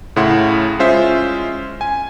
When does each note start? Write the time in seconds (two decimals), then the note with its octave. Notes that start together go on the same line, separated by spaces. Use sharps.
0.16 A2 C#3 E4 F#5 C6
0.79 G#3 C#4 F4 C5 E5
1.81 G#5